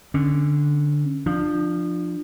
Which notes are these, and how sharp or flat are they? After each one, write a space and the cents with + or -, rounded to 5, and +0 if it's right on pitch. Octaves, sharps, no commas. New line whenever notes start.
D3 +0 C#4 -15
F3 +0 D4 +30